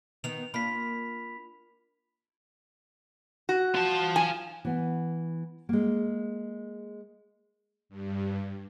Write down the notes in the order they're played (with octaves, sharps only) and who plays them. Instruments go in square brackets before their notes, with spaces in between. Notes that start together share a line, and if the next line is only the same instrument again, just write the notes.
[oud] D#3 B3 [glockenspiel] F7
[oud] A#3 D4 F4 [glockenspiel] B5 B6
[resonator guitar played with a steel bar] F#4
[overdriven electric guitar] F4 A5
[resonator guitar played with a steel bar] G#5
[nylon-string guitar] E3 B3
G#3 A#3
[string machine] G2